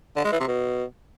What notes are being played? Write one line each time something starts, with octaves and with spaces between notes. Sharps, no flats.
D3
G#3
E3
C3
B2